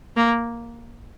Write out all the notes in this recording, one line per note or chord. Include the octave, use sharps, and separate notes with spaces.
A#3